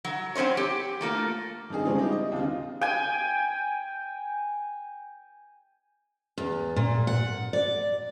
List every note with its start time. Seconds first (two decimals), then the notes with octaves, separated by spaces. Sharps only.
0.05 F#3
0.35 F#3 C4 C#4 C5 C#5
0.57 G4
1.01 A3 A#3 F4
1.70 G2 C3 D#4 G#4
1.85 C#3 F3 G3 G#3 C4 C#4
1.98 D#4 E4 G4
2.12 D#5
2.32 D#2 C#3 F4
2.81 G5 G#5
6.38 E2
6.76 A#2
7.07 F#5
7.53 D5